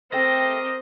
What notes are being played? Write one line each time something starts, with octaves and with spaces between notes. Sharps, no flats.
A3 C4 G4 A4 A#4 D#5 G5 A#6